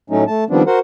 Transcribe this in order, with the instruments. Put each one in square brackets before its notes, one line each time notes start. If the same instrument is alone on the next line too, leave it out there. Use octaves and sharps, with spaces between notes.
[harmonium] A2 F#3 A3 C#4 D#4
A3 A5
D#3 F3 G3 B3 C4 D4
F#4 A#4 C5 F#5